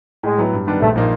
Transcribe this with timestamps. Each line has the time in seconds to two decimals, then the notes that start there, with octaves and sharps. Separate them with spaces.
0.23 A2 G#3
0.38 F#3 B3 E4
0.53 G2
0.67 D#3 G3 B3 D4
0.81 A#1 A3
0.96 A#2 F3 A#3 D#4